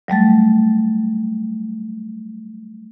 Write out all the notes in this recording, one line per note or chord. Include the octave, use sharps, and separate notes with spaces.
F#3 G3 A3 A6